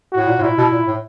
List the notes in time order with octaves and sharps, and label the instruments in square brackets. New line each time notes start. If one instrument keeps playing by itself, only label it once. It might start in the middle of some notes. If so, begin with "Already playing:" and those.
[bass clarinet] A2 [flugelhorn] F#4
[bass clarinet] A#2
A2
[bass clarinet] A#2 [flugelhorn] E4
[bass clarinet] B2
A#2
A2